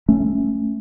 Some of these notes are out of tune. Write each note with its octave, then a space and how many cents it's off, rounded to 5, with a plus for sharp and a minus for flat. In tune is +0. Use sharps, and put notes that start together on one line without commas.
A3 +0 C#4 -5